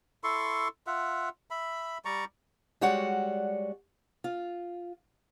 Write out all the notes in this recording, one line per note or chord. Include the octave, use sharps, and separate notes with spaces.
E4 A4 C6 C#6
F4 E5 F#5
E5 B5
G3 D5 A#5 C#6
G3 G#3 F#4 C#5 D5 F#5
F4